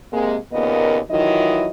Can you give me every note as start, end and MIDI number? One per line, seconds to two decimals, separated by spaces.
0.12 0.37 48
0.12 0.37 56
0.12 0.37 58
0.53 1.00 39
0.53 1.00 46
0.53 1.00 49
0.53 1.00 59
0.53 1.00 70
0.53 1.00 75
1.10 1.69 51
1.10 1.69 52
1.10 1.69 54
1.10 1.69 64
1.10 1.69 65
1.10 1.69 75